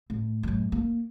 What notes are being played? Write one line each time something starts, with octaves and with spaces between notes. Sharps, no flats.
A2
F#2 A2
A#3